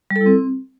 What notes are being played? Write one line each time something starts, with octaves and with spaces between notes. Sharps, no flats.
G3
A4
E4
C4